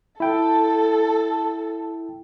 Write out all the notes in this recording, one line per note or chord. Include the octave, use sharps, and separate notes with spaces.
E4 A4 G5